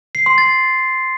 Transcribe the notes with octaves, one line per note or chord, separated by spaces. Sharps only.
C7
C6
A6